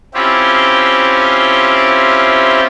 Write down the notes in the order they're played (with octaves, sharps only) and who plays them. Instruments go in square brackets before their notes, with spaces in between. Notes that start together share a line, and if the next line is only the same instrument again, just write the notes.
[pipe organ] C4 C#4 E4 F4 G4